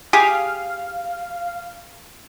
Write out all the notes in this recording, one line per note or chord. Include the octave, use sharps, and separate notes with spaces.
G4 G#4 F5